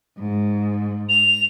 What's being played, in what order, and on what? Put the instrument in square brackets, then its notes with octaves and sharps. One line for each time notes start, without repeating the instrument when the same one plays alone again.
[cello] G#2
[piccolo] F7